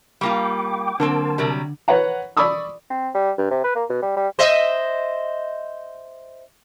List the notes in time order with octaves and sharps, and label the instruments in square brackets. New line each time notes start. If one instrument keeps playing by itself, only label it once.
[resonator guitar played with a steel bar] G3 A#3 F4 [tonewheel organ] G5 D6
[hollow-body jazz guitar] D3 [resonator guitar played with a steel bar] F#3 A#3 C4 [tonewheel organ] A#4 A5
[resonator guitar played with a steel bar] C3 F#3 G3
[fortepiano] B4 C#5 F#5 A#5
D5 B5 C#6 D#6 E6
[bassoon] C4
G3
G2
C3
B4
A#3
B2
G3
G3
[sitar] C5 D#5 E5